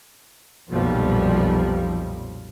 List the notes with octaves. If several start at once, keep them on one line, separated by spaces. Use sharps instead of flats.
B1 F2 A#2 F3 G3